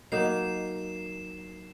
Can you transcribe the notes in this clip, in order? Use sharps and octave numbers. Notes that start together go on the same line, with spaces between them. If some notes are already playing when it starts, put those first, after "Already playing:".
F#3 A#3 D#4 C7 E7